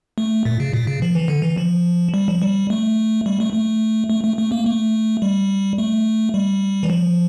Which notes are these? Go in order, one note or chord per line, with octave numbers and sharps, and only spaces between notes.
A3
A#2
C#3
A#2
C#3
F3
E3
D3
E3
F3
G3
F3
G3
A3
G3
A3
A3
A3
A3
A3
A#3
A3
G3
A3
G3
E3
F3